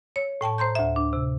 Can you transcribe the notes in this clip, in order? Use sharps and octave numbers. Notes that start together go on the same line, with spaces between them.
C#5
A2 G5 A5 C#6
C5 A#5 C6 G6
D2 E5
D4
C3